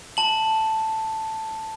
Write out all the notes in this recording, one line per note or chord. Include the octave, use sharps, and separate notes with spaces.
A5 F#7